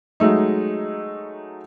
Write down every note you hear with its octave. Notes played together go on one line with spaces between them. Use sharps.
F#3 G#3 A3 D#4